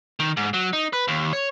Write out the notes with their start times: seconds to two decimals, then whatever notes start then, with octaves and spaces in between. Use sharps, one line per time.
0.20 D#3
0.37 G#2
0.54 F#3
0.73 D#4
0.93 B4
1.08 D#2
1.33 C#5